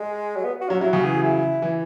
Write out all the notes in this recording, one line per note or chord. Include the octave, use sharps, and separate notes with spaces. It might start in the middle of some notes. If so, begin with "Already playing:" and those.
Already playing: G#3
F#3
B3
F#4
F#3 C#4
F#3 E4
C#3 F#4
E3 G#4
E4
E3